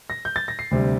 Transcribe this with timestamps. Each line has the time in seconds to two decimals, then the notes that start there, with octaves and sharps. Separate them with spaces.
0.10 A#6
0.25 G6
0.36 A6
0.48 A#6
0.59 C7
0.71 D2 C3 G3